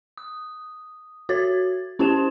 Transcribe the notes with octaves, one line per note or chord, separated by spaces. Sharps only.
D#6
F#4 C#5 G#6 A6
C#4 E4 G4 C5 A5 E7